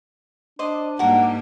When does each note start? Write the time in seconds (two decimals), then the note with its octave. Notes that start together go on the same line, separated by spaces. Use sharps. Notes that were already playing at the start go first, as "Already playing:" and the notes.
0.59 D4 C5 D5 D#5
0.99 G#2 G3 A#3 F#4 A#4